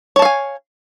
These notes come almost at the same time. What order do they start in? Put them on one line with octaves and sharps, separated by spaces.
C#5 A5 F5 G#5